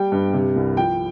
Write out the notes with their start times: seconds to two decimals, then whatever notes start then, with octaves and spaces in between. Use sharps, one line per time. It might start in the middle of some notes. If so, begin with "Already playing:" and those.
Already playing: G3 G5
0.12 G2
0.33 C3
0.56 C2
0.76 F3 G5